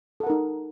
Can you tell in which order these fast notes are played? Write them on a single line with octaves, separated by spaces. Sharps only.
A4 F#5 A#4 D#4